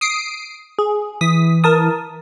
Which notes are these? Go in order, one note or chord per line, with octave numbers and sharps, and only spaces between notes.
D#6 C7 D7
G#4
E3 D#6 B6
A#4 A5 D#6